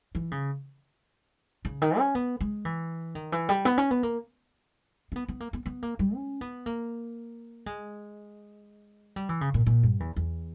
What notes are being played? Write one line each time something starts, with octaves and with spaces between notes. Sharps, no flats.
E3
C#3
C#3
D#3
C#4
B3
G#3
E3
D#3
E3
G3
B3
C#4
B3
A#3
C#4
B3
B3
A#3
B3
B3
A#3
G3
C#4
B3
A#3
G#3
G3
E3
C#3
A#2
A#2
G2
E2
E2